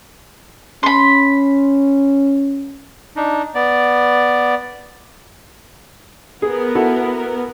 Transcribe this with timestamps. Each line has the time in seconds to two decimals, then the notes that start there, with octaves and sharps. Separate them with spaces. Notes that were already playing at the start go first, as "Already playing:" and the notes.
0.83 C#4 B5 C6
3.16 D4 D#4
3.55 B3 D5
6.42 B3 G#4 A#4
6.75 E4 F#4 A4